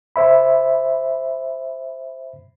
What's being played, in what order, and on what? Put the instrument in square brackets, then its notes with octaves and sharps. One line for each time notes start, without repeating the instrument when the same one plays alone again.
[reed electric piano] C5 E5 B5